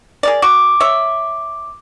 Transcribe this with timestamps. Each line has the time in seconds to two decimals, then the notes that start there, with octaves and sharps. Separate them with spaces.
0.23 G#4 A#4 D5
0.42 F#4 D6
0.80 C#5 E5